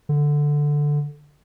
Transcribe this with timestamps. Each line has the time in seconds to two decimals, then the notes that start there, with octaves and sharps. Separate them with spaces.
0.09 D3